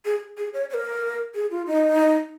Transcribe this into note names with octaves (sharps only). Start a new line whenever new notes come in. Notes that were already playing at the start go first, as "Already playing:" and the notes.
G#4
G#4
C#5
C#5
A#4
G#4
F4
D#4